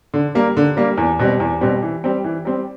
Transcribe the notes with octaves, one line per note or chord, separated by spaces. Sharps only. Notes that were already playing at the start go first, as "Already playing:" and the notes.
D3
G3 A#3
D3
G3 A#3
E2
B2 G3 C4
E2
B2 G3 C4
E3
G3 C4
E3
G3 C4